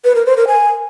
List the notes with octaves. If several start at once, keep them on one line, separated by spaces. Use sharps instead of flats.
B4
A#4
C5
A#4
G#5